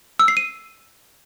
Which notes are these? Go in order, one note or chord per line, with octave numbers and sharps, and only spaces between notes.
E6
C7
D#7